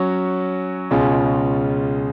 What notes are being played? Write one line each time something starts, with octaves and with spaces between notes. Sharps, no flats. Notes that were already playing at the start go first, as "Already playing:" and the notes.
Already playing: F#3 C#4 F#4 C#5
C#2 B2 G#3 C#4 F4